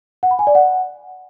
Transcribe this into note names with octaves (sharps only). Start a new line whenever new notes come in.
F#5
B5
G#5
D5
F#5